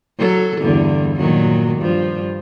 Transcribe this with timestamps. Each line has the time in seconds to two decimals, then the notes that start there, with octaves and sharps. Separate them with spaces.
0.18 F#3 A4
0.61 E2 G2 D3
1.17 A#2 D#3 F#3
1.79 G2 F3